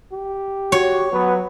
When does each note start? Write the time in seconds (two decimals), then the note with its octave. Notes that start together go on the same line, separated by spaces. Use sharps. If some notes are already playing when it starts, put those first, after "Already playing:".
0.12 G4
0.72 F#4 C#5
1.12 F#3 B3 B4